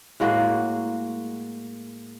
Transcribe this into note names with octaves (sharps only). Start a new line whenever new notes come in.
A2 G#3 A#3 F#4